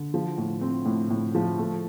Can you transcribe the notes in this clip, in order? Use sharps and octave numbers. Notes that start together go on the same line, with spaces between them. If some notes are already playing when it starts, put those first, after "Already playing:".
Already playing: D3
F3
A2
C4
A2
A2
F3
A3